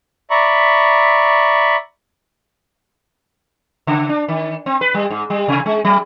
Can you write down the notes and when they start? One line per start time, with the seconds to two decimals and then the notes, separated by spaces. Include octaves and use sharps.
0.31 D5 E5 A#5 B5 C#6
3.87 C#3
4.09 D4
4.28 D#3
4.66 C4
4.81 B4
4.94 G3
5.10 G#2
5.30 G3
5.48 C3
5.66 G#3
5.85 F#3